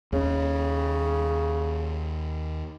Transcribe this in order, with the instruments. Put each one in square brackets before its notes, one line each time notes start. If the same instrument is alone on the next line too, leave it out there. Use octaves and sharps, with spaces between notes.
[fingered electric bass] D#2 C#4 [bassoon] C#3